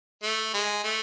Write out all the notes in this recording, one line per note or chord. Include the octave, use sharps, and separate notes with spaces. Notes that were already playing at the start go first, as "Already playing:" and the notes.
A3
G#3
A3